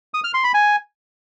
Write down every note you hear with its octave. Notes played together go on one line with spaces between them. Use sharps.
D#6
F6
C6
B5
G#5